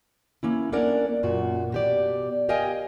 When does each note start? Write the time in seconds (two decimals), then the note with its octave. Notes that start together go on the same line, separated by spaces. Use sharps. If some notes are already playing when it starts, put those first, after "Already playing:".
0.43 A#3 C#4 E4
0.72 A#3 C#4 D4 A#4 D5 F#5
1.23 F#2 A#2 F#4
1.72 B2 G4 D5
2.49 G4 A#4 D#5 F5 G5 G#5